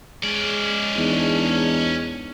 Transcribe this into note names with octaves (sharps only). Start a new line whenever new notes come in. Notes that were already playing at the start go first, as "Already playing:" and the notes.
G#3 C#4 D5
E2 D4 D#4